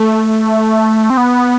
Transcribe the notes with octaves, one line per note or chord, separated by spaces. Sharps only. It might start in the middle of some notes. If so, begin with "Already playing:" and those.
Already playing: A3
C4
B3